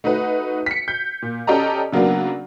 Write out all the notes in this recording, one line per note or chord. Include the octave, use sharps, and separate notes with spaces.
A3 D#4 F#4 B4
B6 C#7
G6
A#2
C#4 G4 A4 D5 D#5 A#5
C#3 F#3 A#3 B3 D4